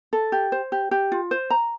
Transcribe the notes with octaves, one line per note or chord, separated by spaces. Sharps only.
A4
G4
C5
G4
G4
F4
C5
A#5